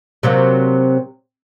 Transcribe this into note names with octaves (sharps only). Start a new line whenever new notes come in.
C3 F#3 A#3